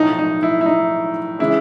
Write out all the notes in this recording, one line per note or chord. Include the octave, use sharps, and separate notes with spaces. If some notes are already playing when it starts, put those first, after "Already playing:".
Already playing: B1 A2 F3 D#4
D#4
E4
E4
D#4
C#3 E3 G#3 E4